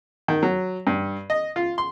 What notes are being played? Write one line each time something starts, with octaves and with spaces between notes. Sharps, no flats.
D#3
F#3
G2
D#5
F4
C6